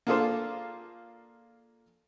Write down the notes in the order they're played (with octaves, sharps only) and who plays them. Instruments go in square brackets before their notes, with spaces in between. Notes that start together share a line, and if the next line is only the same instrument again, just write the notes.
[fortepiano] A#3 D4 F4 G#4 A4 C5